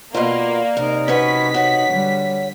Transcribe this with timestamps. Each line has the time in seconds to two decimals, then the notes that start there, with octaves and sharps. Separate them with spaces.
0.14 B2 A#3 F4 D5
0.77 C3 D#4 A#4
1.08 C#4 F#4 B4 B6
1.54 F#4 C#5 F#5
1.88 D3 G3